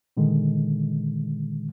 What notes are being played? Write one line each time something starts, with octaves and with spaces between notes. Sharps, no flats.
A#2 D3 D#3 G#3